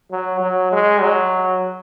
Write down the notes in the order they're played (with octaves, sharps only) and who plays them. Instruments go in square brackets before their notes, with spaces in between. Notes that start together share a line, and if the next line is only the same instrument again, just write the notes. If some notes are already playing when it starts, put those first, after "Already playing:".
[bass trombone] F#3
F#3
G#3
F#3